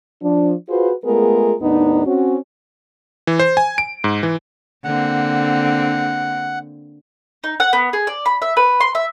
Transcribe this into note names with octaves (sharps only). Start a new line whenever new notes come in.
F3 D4
F4 F#4 G#4 B4 C5
G#3 A3 B3 F4 G#4 A#4
D#2 A2 B3 D4 D#4
C4 C#4 F#4
E3
C5
G#5
D7
G#2
E3
D3 A#3 C4 F#5
D#4
F#5
B3
G#4
D5
B5
E5
B4
C6
E5